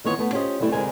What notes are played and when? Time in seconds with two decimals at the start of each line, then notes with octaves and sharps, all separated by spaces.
0.04 D#3 E3 B3 F4 C#5 D#5
0.19 A3 B3
0.32 C#4 F4 G4 C5 C#5 D#5
0.60 C3 E3 G3 A3 E4
0.72 D2 C3 G#3 E4 A#4 G#5